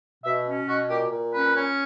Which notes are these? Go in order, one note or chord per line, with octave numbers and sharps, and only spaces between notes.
B2 E5
C#4
B2 F#4
A#2 G4
A#2
C#4 B4
C#4